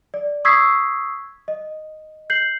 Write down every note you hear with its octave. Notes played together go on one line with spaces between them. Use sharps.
D5
C#6 D#6 E6 G#6 B6 C7
D#5
G6 C7 F#7